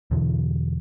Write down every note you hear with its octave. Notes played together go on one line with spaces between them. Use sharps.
E2 B2 D3